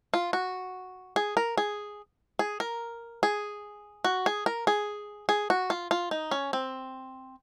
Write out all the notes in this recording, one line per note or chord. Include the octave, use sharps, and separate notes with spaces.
F4
F#4
G#4
A#4
G#4
G#4
A#4
G#4
F#4
G#4
A#4
G#4
G#4
F#4
F4
F4
D#4
C#4
C4